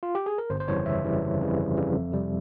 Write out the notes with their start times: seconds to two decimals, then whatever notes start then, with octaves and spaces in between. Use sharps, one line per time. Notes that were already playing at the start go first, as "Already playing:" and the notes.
0.03 F4
0.15 G4
0.26 G#4
0.38 A#4
0.50 G1 C5
0.60 C5
0.68 F2 C#3 E3 G3 C#5
0.86 G1 E5
1.04 F2 C#3 E3 G3
1.22 G1
1.41 F2 C#3 E3 G3
1.58 G1
1.77 F2 C#3 E3 G3
1.94 F2
2.12 C3 G3